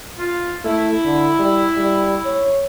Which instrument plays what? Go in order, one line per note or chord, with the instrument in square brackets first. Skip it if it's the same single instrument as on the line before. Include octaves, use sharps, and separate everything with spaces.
[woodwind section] F4
[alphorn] A3 [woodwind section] E4
[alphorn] D3
G3
G3
C#5